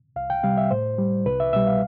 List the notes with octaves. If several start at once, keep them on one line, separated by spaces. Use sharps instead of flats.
C2 F5
G5
C3 G3 F5
E5
A2 C5
G3
C2 B4
E5
B2 G3 E5
F5